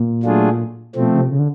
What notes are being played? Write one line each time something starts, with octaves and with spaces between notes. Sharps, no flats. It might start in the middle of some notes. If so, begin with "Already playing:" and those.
Already playing: A#2
F#3 A3 D4 F4 G#4
B2 F3 A3 C4
C#3
C3
C#3
D3